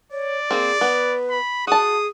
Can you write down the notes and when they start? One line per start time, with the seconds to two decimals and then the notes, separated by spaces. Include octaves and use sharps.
0.12 C#5 D5
0.51 A#3 C4 G#4
0.81 B3 B4
1.30 B5
1.67 F#4 G#4 A5 D#6